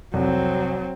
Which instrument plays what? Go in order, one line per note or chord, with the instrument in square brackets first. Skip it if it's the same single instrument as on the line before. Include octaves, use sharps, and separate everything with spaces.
[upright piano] C2 F2 [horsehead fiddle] F#3 C4